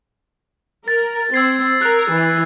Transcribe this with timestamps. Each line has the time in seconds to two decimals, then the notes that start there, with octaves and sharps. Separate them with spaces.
0.88 A#4 A6
1.34 C4 E6 G#6 C7
1.82 A#4 F#6
2.12 E3